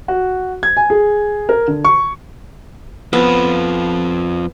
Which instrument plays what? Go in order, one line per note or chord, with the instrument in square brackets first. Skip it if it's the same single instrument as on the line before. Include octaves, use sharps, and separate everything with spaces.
[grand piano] F#4
G#6
G#5
G#4
A#4
D3
C#6
[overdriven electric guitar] F2 F3 [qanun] B3